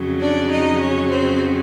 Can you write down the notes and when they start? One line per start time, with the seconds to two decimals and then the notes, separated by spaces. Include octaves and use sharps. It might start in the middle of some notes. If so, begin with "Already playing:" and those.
Already playing: F2 C#3 F#3
0.20 D4 D5
0.50 D#4 D#5
0.80 C#4 C#5
1.10 C4 C5